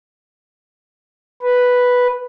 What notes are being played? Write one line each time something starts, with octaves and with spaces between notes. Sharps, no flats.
B4